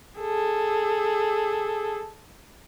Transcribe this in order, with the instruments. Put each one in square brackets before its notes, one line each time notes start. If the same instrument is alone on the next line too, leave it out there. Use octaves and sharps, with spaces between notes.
[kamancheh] G#4 A4